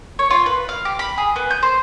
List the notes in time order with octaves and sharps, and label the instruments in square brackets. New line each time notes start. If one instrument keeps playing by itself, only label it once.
[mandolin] C#5
F4
B4
F5
G4
B5
G#4
B3
G6
C5